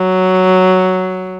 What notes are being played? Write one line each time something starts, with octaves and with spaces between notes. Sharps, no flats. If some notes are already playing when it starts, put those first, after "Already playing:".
Already playing: F#3